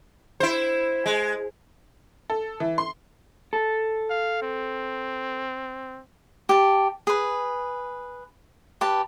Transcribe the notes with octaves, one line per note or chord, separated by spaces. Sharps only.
E4 C5
G#3
A4
E3
C6
A4
F5
C4
G4 A5
G#4 B4
G4 B4 A5